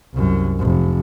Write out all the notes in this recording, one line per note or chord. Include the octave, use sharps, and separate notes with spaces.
C2 F#2
F1